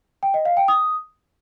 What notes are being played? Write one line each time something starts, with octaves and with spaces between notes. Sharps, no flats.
G5
D#5
F5
G5
D#6